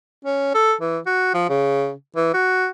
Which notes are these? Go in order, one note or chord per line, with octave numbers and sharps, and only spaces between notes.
C#4
A4
E3
F#4
F3
C#3
E3
F#4